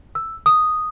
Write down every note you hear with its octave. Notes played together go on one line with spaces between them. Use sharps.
E6
D#6